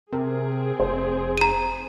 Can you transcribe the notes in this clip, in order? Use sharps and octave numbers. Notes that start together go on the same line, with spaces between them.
C3 C4 G#4 A#4
F1 C5
A#5 D#7